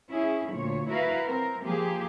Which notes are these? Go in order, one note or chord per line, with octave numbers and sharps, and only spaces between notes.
C#4 E4 G#4
D2 A#2 C#5
E4 F#4 A#4 B4 F5
C4 A#4
F3 A#3 G4 G#4